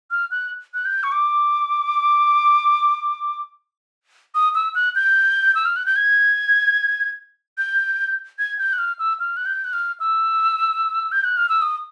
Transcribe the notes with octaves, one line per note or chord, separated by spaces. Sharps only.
F6
F#6
F#6
G6
C#6
D6
D#6
E6
F#6
G6
E6
F6
F#6
G6
G#6
G6
G#6
G6
F#6
F6
E6
F6
F#6
G6
F#6
F6
E6
G6
F#6
F6
E6
D#6